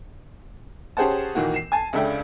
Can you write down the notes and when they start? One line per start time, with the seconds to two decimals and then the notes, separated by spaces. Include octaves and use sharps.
0.97 C#4 G4 G#4 C5 F#5 A5
1.35 A#2 D#3 E3 A#3 F#4
1.54 C7 E7
1.72 G#5 A5
1.93 C#2 C#3 D4 A4 E5 G5